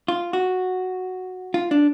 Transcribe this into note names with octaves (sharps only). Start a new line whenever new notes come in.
F4
F#4
F4
D4